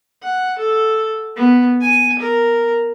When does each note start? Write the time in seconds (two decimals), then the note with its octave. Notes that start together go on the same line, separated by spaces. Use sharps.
0.23 F#5
0.58 A4
1.36 B3
1.82 G#5
2.19 A#4